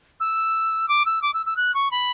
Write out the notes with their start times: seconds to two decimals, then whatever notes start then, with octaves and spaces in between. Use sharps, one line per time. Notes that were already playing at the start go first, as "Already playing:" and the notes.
0.20 E6
0.89 D6
1.06 E6
1.22 D6
1.34 E6
1.46 E6
1.57 F#6
1.74 C#6
1.91 B5